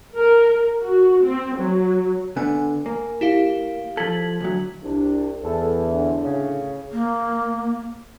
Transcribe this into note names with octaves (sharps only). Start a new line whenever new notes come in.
A#4
F#4
C4
F#3
D3 B3 G#5
A#3
E4 G4 F5
F3 A4 G#6 B6 F#7
D2 F#3
C2 D4
E2 A4
A2 D3
C#3
A#3